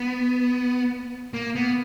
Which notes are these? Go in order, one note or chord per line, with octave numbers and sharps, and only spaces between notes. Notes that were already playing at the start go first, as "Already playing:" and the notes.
Already playing: B3
A#3
B3